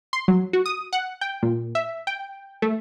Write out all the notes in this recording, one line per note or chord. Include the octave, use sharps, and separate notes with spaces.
C6
F#3
F#4
D#6
F#5
G5
A#2
E5
G5
A3